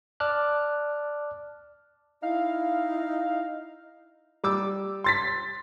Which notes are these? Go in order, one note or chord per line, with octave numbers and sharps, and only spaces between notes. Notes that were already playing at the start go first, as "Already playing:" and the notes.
D5 A5 D6 F6 F#6
D#4 E4 F5
G3 D6 E6
C6 A6 B6